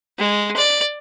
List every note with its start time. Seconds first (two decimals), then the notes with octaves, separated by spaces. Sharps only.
0.18 G#3
0.56 D5